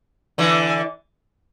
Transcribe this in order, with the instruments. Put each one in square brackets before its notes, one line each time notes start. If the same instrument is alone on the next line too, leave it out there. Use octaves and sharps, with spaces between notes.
[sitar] D3 E3